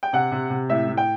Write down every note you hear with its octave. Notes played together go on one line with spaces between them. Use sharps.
G5
C3 F#5
C3
C3
A2 E5
A2
G5